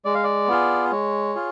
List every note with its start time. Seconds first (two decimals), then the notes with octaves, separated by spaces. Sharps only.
0.05 G#3 D5
0.15 F5
0.24 D5
0.48 B3 F4 G#4
0.92 G#3 C#5
1.35 F4 G#4